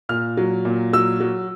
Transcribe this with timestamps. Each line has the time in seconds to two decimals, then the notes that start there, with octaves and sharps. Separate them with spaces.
0.09 A#2 F6
0.37 F#3
0.65 A#2
0.93 F#3 E6
1.20 F#3